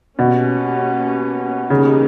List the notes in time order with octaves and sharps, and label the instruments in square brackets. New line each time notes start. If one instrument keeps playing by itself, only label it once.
[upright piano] B2 [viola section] A#3 C#4 G4
[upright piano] C#3 [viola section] E3 G3 A#3 D#4 G4